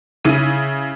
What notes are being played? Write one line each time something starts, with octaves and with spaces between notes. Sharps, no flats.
C#3 E4 D#7